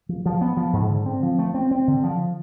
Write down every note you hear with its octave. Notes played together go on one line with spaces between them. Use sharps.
F3
F3
B3
F3
G#2
D3
C4
F3
A3
C4
C4
D3
F3